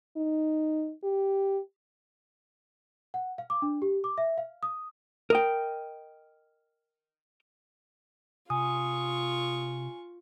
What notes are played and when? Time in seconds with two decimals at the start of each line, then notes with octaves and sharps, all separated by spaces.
0.17 D#4
1.04 G4
3.14 F#5
3.38 F5
3.50 D6
3.62 D4
3.82 G4
4.04 D6
4.18 E5
4.38 F5
4.63 D#6
5.30 A#4 D#5 G5
8.50 C3 F4 G#5 C#6 D#6